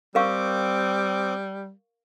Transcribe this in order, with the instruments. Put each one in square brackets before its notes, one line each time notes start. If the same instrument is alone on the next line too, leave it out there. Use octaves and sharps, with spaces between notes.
[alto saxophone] G3 [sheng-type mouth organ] C4 D6 [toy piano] A#4 F5 C#6